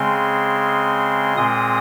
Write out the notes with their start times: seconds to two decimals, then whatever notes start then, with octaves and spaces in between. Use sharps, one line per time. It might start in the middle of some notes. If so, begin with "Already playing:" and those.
Already playing: C#3 G#3 C4 C6
1.36 A#2 G#3 C4 D#6